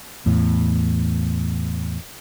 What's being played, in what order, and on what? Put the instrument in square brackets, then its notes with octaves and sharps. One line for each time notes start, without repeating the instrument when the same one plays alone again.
[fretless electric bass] E2 A2